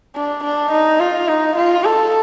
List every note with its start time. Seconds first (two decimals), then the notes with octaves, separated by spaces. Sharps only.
0.15 D4
0.44 D4
0.71 D#4
1.00 F4
1.28 D#4
1.56 F4
1.84 A4